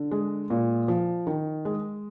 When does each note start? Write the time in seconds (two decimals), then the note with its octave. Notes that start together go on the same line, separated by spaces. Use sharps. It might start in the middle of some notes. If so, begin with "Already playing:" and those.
Already playing: D3
0.11 G#3
0.50 A#2
0.88 F3
1.27 D#3
1.65 G#3